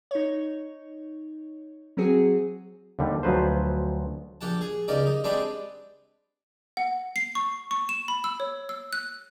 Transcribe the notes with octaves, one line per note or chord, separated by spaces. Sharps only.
D#4 C#5
F#3 C4 F#4 G#4
D#2 D3 G3
D2 F3 F#3 B4 C5
A#1 G4 F#5 A5
G#4
C#2 A#3 D#4 G4 D5
D#4
G#3 C4 D4 G4 B4 D5
F#5
C7
C#6
C#6
E7
B5
E6
C#5
E6
F#6